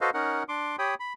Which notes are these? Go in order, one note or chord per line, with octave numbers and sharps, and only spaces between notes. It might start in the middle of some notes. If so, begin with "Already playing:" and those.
F#4 A4 B4 C5 D#5 F5
C#4 D#4 A#4 F#5
D4 C6 D6
G4 C#5 G5 B5 D#6
B5